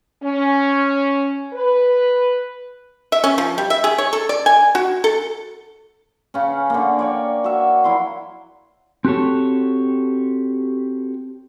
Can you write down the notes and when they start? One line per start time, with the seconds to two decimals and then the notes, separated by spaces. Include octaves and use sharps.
0.23 C#4
1.54 B4
3.12 E5
3.24 C#4
3.38 F3
3.58 G3
3.70 E5
3.84 G#4
3.98 C#5
4.13 A4
4.29 D5
4.46 G#5
4.75 F#4
5.04 A4
6.34 C#3 C#4
6.70 D3 A#3
6.99 C#5 D5 G5
7.44 F#4 E5
7.84 F#3 E4 C6
9.05 C4 F#4 G4 A4 C#5